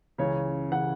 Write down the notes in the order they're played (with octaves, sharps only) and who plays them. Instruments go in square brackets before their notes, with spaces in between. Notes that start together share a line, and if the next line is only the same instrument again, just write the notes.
[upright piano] C#2 C#3 E3 C#5
C#3 E3 F#5